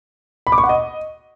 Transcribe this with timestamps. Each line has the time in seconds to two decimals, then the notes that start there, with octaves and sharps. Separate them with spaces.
0.47 B5
0.52 D6
0.58 C#6
0.64 F#5
0.69 D#5